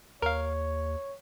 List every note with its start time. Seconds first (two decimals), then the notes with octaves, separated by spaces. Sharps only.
0.22 D#2 A#4 C#5 F5